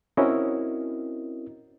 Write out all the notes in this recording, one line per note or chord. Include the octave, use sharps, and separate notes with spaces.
C4 C#4 E4 F#4 A#4 D#5